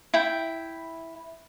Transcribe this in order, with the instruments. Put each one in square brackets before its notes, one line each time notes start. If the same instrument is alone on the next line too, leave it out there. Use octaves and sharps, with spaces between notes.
[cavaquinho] E4 G5